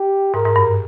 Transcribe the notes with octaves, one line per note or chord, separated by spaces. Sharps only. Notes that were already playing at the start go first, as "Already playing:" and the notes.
Already playing: G4
G#2 A#4
G#2
G2